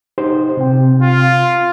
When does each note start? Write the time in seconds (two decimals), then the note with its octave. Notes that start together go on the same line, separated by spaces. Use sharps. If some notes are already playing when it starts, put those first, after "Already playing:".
0.18 D#4 G4 C5
0.57 C3 C4 G5
1.03 F4